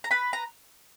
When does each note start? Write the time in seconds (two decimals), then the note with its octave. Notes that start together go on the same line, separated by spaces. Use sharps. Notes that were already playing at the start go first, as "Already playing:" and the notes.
0.04 A#5
0.11 B4 B5
0.33 A#5